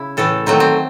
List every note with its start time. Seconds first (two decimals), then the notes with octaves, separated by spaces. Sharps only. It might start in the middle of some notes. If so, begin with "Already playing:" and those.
Already playing: C#3 E4
0.17 A2 E3 A3 A4
0.46 D#3 F#3 A3 C4
0.60 C4